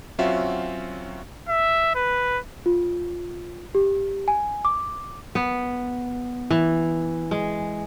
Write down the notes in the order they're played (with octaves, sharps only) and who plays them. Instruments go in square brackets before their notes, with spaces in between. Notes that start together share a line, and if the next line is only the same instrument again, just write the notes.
[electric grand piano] F#3 C4 C#4 F4 F#4 E5
[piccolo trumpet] E5
B4
[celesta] F4
G4
G#5
D6
[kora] B3
E3
G#3